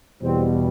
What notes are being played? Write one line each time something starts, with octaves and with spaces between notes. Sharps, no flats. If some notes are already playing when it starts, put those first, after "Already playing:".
E2 B2 G3 C4